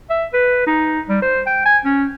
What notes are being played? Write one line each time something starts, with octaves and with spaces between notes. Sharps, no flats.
E5
B4
D#4
G3
C5
G5
G#5
C#4